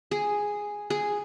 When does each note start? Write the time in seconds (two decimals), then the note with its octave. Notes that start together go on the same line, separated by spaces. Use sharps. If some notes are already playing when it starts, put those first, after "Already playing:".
0.11 G#4
0.90 G#4